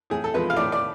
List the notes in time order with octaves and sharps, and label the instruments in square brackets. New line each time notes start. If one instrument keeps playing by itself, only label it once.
[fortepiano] A2 G#4
A4
F3 G#3 B4
F5
A2 D5
D5